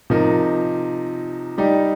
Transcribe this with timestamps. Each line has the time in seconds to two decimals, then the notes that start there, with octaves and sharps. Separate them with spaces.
0.10 C3 F3 D#4 A#4
1.58 G3 D#4 G4